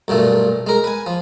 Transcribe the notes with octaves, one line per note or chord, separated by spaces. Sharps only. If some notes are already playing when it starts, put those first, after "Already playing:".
B1 G2 A#2 A3
G#3 A#4
B4 G#5
F3